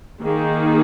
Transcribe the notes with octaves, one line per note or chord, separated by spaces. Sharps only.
D#3 A#3 D#4 G#4